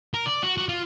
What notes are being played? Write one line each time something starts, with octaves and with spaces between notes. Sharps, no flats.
A#4
D5
F#4
F#4
F4